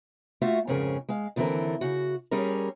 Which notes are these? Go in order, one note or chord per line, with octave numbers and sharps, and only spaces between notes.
A3 F4 F#4 E5 F5
F2 G#2 C#3 C#4 G#4 A#4
G#3 F5
D#2 D3 E3 C4 A4 A#4
C#3 F#4
G3 C#4 G#4 A#4